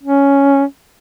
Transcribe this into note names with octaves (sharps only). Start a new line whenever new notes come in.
C#4